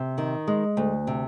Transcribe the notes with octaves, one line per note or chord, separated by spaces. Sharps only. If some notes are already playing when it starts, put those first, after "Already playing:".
Already playing: C3
D#3
G#3
D2
C3